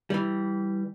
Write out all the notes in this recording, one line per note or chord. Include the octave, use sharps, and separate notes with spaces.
E3 G3